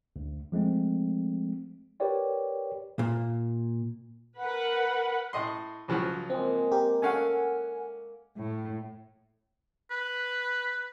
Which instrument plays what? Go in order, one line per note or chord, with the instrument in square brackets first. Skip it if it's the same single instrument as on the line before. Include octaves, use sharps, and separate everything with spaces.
[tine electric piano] D2
F3 G#3 A3 C4
G4 A#4 B4 C#5 D5 G5
[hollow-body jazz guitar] A#2
[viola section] A#4 B4 F#5
[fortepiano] A2 D#5 C6
C#2 F3 F#3
[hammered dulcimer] G#3 A#3 [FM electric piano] C4
[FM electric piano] C4 G4 A#4
[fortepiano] A3 C#4 F5 [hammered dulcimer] A#4 [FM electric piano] F#5 G#5
[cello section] A2
[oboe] B4